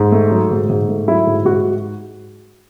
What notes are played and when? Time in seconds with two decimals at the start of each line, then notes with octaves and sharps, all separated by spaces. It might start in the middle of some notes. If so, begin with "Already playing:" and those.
Already playing: G#2
0.12 A3
0.31 F#3
0.51 G#2
0.69 G#2
0.88 A3
1.08 F#3 E4
1.27 G#2
1.45 G#2 F#4